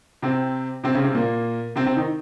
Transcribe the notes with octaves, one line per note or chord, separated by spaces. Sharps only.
C3 C4
C3 C4
C#3 C#4
C3 C4
A#2 A#3
C3 C4
C3 C4
D#3 D#4